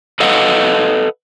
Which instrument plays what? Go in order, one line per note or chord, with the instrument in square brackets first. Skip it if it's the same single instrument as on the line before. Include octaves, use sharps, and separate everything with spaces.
[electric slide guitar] A4 B4 D#5 F5 F#5